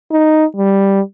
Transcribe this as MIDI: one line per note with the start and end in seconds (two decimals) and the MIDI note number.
0.11 0.44 63
0.56 1.00 55